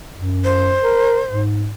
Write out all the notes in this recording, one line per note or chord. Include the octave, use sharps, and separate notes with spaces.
F#2
C5
A#4
G#2